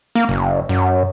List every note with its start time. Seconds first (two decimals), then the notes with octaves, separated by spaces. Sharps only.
0.15 A#3
0.29 F#1
0.69 F#2